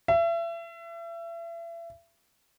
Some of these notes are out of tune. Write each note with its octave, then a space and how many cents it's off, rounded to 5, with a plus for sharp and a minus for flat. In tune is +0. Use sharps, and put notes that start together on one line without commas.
E5 +35